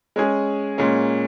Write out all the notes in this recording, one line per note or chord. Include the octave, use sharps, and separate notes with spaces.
G#3 C#4 G#4
A#2 G#3 C#4